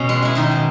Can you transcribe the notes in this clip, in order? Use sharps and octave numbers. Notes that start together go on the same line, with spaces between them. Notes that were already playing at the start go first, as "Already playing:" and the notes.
Already playing: B2 C#4
G#3
G#3 E4
B2 D#3 D#4
B2